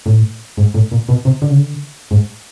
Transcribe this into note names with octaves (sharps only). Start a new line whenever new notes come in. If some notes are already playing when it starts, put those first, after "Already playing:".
A2
G#2
A2
A#2
B2
C3
D3
C#3
D3
G#2